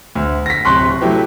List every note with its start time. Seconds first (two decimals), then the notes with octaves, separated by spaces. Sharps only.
0.15 D2
0.46 A#6 B6
0.65 D1 C3 C6 C#6 F#6
1.01 F#3 A3 E4 G4 B4